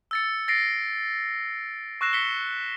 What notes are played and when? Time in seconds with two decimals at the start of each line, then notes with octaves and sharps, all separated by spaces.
0.11 E6 A6 C#7
0.48 A6 A#6 C7 D7
2.01 C#6 E6 F#6 A#6 C7 E7
2.13 B6 C#7 G7